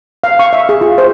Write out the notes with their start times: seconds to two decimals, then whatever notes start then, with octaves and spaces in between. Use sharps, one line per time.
0.24 F5
0.39 C#6
0.53 E5
0.69 G#4
0.81 F4
0.98 C5